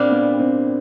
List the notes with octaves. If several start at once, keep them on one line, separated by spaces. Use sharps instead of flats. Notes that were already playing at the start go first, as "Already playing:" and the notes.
Already playing: A#2 G3 A#3 C4 D4
B3
C4